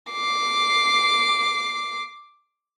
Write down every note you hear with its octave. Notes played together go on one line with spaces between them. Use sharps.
D6 C7